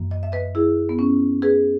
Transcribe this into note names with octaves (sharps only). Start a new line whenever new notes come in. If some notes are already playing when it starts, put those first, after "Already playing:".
Already playing: F#2 E3 A#3
D#5
E5
B4 D#5
E4 G#4
B3
C#4
G#4 B4